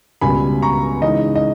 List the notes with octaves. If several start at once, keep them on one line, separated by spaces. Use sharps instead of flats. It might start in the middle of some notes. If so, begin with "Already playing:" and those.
C#2 B2 G3 G#5 B5
A#5 C#6
C#3 E3 G#3 D#4 D#5
D#5